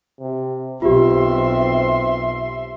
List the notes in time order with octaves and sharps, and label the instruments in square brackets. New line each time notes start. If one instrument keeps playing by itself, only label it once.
[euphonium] C3
[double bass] B1 [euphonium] C4 [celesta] F4 G4 [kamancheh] E5 C6